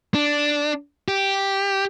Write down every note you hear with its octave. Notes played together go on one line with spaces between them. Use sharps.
D4
G4